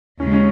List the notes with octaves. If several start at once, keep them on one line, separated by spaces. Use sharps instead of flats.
D#2 C#3 G#3 C#4
C#4